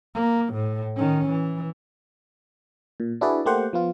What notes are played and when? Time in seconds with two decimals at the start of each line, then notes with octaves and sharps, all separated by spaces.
0.15 A#3
0.54 A2
0.96 D#3 C#4
1.28 E3
3.00 A#2
3.21 D4 E4 F#4 G#4 B4 D5
3.45 A3 A#3 G4 C5 F#5
3.73 F3 B3 F4